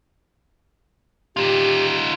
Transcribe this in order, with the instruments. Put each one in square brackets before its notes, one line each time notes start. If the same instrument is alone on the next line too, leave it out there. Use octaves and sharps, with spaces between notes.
[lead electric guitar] D#4 F4 [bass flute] G4